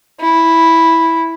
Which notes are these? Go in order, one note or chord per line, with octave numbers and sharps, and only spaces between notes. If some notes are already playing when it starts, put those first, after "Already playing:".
E4